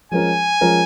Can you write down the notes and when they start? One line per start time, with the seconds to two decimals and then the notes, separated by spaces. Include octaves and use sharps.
0.12 F3 G#3 C#4 F4 A#4 G#5
0.61 F3 G#3 C#4 F4 A#4